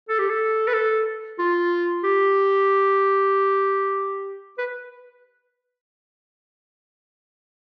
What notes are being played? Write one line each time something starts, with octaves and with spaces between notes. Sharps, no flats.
A4
G4
A4
B4
A4
F4
G4
B4